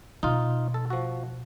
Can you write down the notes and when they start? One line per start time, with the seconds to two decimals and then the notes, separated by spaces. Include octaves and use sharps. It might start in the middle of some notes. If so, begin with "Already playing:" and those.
0.23 B2 D#4 F4
0.74 A4
0.90 F3 F#4